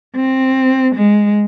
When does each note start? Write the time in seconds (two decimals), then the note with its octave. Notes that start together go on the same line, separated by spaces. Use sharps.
0.16 C4
0.95 G#3